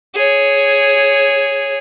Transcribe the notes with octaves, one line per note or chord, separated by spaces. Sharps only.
G#4 C#5